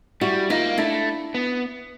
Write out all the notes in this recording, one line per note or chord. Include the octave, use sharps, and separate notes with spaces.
G3 E4 F#4
A#3 D#4 F4
A3 D4 E4
B3